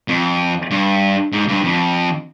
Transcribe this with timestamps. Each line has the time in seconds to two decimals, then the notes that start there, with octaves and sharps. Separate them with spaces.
0.08 F2
0.71 G2
1.32 G#2
1.49 G2
1.64 F2